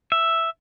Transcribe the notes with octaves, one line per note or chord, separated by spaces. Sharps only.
E5